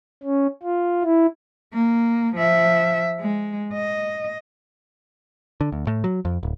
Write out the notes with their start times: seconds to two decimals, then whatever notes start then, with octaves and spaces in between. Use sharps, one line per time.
0.23 C#4
0.63 F4
1.04 E4
1.74 A#3
2.35 F3 E5
3.20 G#3
3.73 D#5
5.61 D3
5.72 D2
5.87 A2
6.04 F#3
6.25 F2
6.43 D1